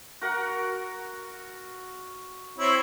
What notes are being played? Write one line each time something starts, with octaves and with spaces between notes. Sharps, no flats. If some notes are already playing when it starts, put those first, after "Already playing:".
F#4 A#4 F#5
C4 E4 C#5